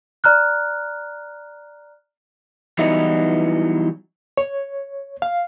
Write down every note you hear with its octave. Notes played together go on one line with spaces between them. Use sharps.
D5 A#5 F6 F#6
E3 F#3 G3 B3 D#4 E4
C#5
F5